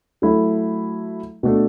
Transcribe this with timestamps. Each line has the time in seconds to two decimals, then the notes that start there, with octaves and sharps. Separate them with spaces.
0.22 F#3 A3 E4 A4
1.43 B2 A3 D4 A4